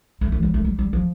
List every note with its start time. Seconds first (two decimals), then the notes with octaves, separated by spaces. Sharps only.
0.21 A3
0.32 E3
0.43 G3
0.54 A3
0.65 G3
0.79 G3
0.93 F3